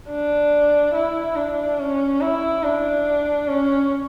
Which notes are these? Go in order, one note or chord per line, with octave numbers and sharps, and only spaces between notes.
D4
E4
D4
C#4
E4
D4
C#4